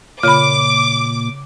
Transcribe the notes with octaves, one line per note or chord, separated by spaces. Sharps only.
A#2 C#3 B5 D6